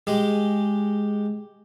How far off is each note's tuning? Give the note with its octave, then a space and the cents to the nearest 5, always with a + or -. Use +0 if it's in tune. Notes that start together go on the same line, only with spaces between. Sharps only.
G#3 +0 G4 +0